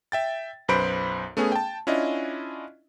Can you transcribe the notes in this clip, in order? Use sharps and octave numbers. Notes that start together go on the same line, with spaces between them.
E5 G5 A6
B1 F#2 B4 C5 B5 D7
A3 B3 C#4 G#4
G5 A5
C#4 D4 E4 F4 D#5